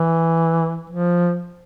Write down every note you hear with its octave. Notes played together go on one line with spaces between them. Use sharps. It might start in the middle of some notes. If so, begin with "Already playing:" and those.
Already playing: E3
F3